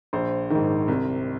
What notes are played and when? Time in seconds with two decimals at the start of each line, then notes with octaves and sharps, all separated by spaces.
0.13 A#1 C5
0.50 G#2 D#3
0.88 C2